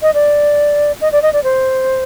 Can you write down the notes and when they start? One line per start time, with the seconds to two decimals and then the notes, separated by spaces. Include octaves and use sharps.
0.02 D#5
0.14 D5
1.01 D#5
1.12 D5
1.22 D#5
1.33 D5
1.44 C5